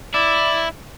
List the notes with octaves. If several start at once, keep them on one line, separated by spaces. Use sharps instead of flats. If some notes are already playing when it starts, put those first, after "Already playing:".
E4 D5